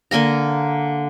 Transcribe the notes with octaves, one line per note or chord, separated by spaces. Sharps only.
D3 A#3 G#5 A#5